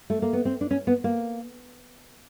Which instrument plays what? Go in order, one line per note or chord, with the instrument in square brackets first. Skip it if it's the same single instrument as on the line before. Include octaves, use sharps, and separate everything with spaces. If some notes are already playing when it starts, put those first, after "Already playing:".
[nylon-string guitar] A3
A#3
B3
C4
D4
C#4
B3
A#3